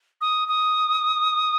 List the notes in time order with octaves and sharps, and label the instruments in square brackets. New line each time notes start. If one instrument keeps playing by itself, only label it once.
[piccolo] D#6
D#6